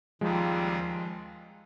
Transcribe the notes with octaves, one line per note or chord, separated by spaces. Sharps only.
D#2 D#3 F3 G3 G#3 C4 F4